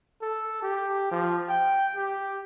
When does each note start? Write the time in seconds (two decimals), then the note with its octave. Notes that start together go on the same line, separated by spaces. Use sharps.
0.22 A4
0.63 G4
1.11 F3
1.49 G5
1.96 G4